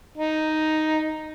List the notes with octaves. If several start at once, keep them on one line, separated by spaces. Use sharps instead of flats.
D#4